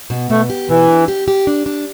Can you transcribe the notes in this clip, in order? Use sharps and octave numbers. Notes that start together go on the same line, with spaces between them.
B2
B2 A3
G4
B2 E3
D4
G4
G4
D4
D4